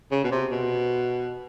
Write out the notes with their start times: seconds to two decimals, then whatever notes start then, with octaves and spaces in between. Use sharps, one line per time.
0.11 C#3
0.24 B2
0.31 C3
0.51 B2